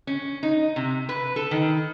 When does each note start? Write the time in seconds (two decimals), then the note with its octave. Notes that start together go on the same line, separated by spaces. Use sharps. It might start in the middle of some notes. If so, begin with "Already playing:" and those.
0.07 C#4
0.43 D#4
0.76 C3
1.09 B4
1.36 A4
1.51 D#3